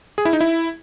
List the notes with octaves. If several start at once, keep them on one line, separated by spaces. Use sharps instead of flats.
G#4
E4
D#4
E4